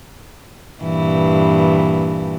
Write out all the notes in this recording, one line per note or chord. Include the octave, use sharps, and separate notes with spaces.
G2 A#2 E3